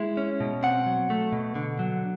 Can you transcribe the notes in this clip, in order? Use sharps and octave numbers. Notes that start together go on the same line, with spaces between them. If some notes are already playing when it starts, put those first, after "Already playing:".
Already playing: G#3 E4
C#4
B2
C4 F#5
F#3
A3
B2
D3
F#3